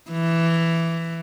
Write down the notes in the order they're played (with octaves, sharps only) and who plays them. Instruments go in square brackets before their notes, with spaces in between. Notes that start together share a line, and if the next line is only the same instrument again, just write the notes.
[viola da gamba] E3